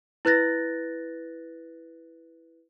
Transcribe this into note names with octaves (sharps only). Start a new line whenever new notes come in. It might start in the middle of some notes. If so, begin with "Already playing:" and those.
E4 B4 F#6 A6 A#6